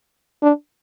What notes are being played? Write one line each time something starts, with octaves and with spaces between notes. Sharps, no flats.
D4